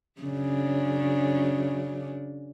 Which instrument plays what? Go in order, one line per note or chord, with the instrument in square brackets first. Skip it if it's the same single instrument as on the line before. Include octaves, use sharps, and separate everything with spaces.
[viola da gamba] F#2 C#3 D4